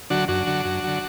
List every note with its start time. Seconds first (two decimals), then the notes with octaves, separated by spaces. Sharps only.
0.10 D3 F#3 D4 F#4
0.28 F#2 D4 F#4
0.47 D3 F#3
0.65 F#2
0.84 D3 F#3